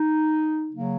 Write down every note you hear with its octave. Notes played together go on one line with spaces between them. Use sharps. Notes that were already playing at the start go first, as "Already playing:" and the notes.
Already playing: D#4
C#3 F#3 A#3